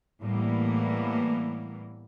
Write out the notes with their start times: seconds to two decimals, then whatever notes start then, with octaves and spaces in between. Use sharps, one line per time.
0.23 A2 E3 G3 A#3 B3